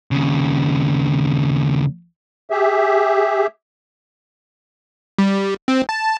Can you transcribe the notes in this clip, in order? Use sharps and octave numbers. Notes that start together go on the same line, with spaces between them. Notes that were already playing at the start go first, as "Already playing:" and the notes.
D#2 C#3
G4 G#4 E5
G3
C4
A5